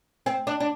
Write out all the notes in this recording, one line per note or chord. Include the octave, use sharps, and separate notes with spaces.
C4
D4
D4